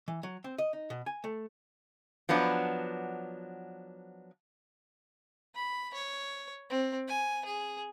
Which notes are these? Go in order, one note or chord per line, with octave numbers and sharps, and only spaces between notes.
E3
F#3
C4
D#5
D#4
B2
G#5
A3
F3 F#3 B3 D4
B5
C#5
C4
G#5
G#4